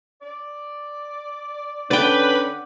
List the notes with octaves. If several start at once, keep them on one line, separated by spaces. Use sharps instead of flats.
D5
D3 C#4 B4 D5 F#5 G5 B5